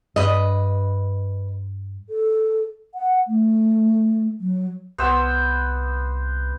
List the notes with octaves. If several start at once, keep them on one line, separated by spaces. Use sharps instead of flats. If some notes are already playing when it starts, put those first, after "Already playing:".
G2 B4 D#5
A4
F#5
A3
F#3
C2 B3 C5 E6